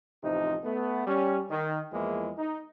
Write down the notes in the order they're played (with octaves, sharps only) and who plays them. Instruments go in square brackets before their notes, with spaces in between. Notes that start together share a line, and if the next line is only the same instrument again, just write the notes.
[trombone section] A1 C3 F3 D#4
A3 B3
G3 C#4
D#3
E2 F3 G#3 A#3 E4
D#4